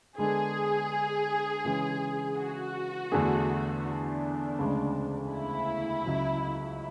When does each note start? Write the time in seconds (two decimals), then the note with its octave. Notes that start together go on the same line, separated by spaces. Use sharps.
0.18 D3 G#3 B3 D4 G#4 A4
1.65 C#3 E3 G#3 C#4
2.38 F#4
3.12 E2 D3 A3 D4 G#4
3.85 D4
4.59 D2 C#3 G#3
5.32 E4
6.05 C#2 C#3 F#3